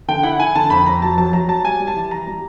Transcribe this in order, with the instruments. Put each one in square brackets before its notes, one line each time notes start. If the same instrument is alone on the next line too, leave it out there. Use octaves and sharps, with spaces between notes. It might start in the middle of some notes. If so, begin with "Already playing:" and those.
[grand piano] D3 G5
E4 F#5
E4 G#5
D3 A5
F2 B5
F2 A#5
F#3 A5
F#3 A5
F#3 A#5
F#3 A5
G3 G#5
G3
A5
E3
E3 A#5
G3